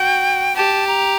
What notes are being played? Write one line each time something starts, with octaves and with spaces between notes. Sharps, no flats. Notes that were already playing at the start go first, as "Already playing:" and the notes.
Already playing: F#4 G5
G4 A5
A#5